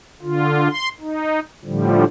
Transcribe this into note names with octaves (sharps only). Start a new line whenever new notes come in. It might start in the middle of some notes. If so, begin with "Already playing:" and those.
D3 F4
C6
D#4
A2 D3 F3 G3